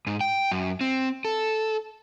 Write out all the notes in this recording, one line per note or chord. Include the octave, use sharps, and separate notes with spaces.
G#2
G5
F#2
C4
A4